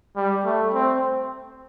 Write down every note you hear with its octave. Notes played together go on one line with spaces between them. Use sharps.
G3
A3
C4